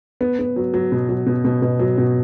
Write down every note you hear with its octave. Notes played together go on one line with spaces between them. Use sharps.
B3
B3
F#3
F#3
B2
F#3
B2
B2
B2
F#3
B2